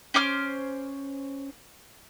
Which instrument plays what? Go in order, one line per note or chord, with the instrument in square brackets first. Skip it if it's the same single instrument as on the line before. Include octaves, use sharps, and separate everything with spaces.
[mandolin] C#4 C5 D6 F6